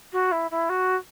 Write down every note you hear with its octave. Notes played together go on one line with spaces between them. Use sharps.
F#4
E4
E4
F#4